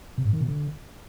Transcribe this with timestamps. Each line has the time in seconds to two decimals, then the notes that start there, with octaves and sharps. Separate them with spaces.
0.18 C3
0.25 G#2
0.33 D#3
0.41 B2
0.48 D3